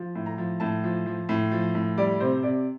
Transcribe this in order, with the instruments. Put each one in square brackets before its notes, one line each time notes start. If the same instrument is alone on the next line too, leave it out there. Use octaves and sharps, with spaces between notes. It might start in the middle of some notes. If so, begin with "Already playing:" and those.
Already playing: [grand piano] F3
A2
A#5
F3
A2 A5
F3
F3
A2
F3
A2
G3 D5
C3 C5
C3 D5